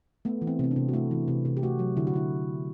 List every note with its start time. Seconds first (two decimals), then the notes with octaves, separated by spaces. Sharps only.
0.25 A3 B3
0.42 E3
0.47 C4
0.59 C3 C4
0.71 D4
0.76 C3
0.89 F#4
0.93 A3 E4
1.11 E3
1.28 C3
1.45 C3
1.57 G4
1.63 A3 F#4
1.79 F#3
1.97 D3 E4
2.07 F#4
2.14 D3 E4